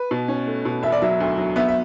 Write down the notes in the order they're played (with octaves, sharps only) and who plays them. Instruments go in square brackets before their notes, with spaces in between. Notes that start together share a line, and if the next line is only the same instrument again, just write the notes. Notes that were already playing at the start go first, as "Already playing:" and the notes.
Already playing: [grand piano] B4
[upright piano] B2
C#4
A3
B2
[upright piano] E1 [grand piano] E5
[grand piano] D5
[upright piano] F#3 [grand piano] E5
[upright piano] D2
F#3
[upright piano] B3 [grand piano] E5
[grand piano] E5